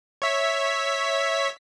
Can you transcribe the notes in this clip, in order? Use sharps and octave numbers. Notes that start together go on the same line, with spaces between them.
C#5 E5 B6